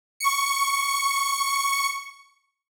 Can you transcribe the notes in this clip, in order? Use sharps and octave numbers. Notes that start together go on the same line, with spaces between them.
C#6 C#7